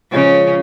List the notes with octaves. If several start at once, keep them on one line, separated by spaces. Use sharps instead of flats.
C#3 F3 G#3 C#4 F4